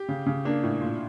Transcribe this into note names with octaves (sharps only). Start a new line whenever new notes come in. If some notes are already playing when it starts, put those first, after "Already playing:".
Already playing: G4
C#3
C#3
A#3 D4
A2
A#2